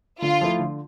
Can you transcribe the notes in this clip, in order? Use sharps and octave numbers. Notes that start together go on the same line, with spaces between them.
D3 F4
F3 A3 E4
D3